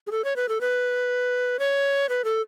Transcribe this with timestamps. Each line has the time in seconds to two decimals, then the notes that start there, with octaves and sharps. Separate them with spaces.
0.07 G#4
0.11 A4
0.24 C#5
0.36 B4
0.49 A4
0.61 B4
1.59 C#5
2.09 B4
2.24 A4